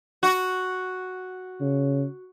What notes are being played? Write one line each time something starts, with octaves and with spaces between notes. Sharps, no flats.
F#4
C#3